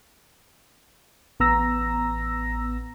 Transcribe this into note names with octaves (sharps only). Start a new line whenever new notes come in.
A1 B3 A#5 E6 A#6